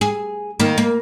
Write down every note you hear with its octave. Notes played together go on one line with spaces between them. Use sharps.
G#4
D#3 A#3
A#3